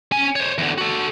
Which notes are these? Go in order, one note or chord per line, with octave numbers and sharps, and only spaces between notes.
C#4 G#5
C5 C#5
E2 D3
F#4 A4